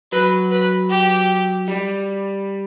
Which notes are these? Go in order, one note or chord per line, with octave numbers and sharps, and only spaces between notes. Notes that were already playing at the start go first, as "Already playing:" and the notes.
F#3 B4
B4
G4
G3